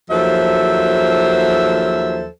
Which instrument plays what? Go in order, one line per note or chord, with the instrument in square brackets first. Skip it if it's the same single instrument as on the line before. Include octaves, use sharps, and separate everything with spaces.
[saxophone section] D#2 F3 F#3 A4 C5 E5